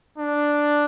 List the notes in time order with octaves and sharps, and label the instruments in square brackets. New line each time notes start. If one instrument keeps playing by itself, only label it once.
[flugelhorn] D4